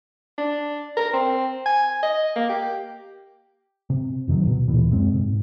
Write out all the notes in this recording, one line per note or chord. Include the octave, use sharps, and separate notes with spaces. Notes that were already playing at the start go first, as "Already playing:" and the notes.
D4
A#4
C4
G#5
D#5
A#3
G4
C3
F2 C3 D#3 F#3
D1 B2
D2 A#2 E3
F#2 G#3 C4
G#2 C3